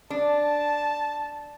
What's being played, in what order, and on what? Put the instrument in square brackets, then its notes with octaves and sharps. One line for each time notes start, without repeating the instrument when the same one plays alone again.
[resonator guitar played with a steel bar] D4 [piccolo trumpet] A5